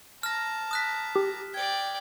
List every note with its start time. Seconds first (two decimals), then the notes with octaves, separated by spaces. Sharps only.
0.23 A5 A#5 F6 A#6
0.71 D#6 F#6 B6
1.16 G4
1.54 D5 G5 G#6